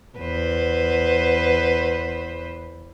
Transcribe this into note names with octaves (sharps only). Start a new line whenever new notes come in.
E2 B4 C5